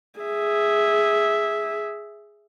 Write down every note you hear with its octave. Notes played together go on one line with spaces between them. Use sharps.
G#4 E5